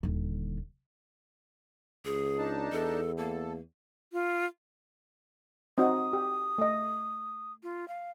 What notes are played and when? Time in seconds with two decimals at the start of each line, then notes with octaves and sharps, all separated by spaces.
0.03 D#1 D3
2.05 C#2 G#4
2.38 D4 D#4 A5
2.72 E2 A4
3.18 A#3 A4
4.13 F4
5.78 C4 D#4 F#4 D#6
6.13 G4
6.58 A3 D#5
7.63 F4
7.88 F5